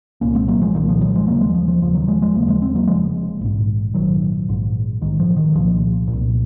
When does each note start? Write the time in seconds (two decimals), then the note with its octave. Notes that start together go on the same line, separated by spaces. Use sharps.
0.21 C2 A#2 A#3 C#4
0.35 G#3 C4
0.48 F#3 A#3
0.62 F3 G#3
0.75 C2 A#2 D#3 F#3
0.89 F3
1.01 D#3 F#3
1.15 F3 G#3
1.27 F1 D#2 C#3 F#3 A#3
1.41 F3 G#3
1.54 F3
1.68 F3
1.81 F1 D#2 C#3 F3
1.95 D#3 F#3
2.08 F3 G#3
2.21 F3 G#3
2.35 F1 D#2 C#3 F#3 A#3
2.48 F3 G#3
2.62 G#3 C4
2.75 F#3 A#3
2.88 F1 D#2 C#3 F3 G#3
3.41 A#1 G#2
3.94 A#1 G#2 D#3 F#3
4.49 A#1 G#2
5.01 A#1 G#2 D#3
5.20 F3
5.37 D#3
5.55 C2 A#2 F3
6.08 A#2
6.13 C2